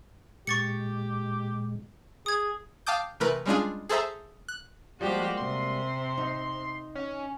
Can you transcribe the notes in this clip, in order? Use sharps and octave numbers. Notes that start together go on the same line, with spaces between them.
A#2 G#3 G4 C#6 A6 C#7
G#4 D#6 G#6
F5 G5 A5 D6 D#6 G6
C3 E3 A3 A#4 B4
G3 G#3 C#4 D4 F4 G#4
G#4 A4 C5 E5 A#5
F#6
F3 G3 G#3 A#3 F#4 G4 C5
C3 C6
D#4
C#4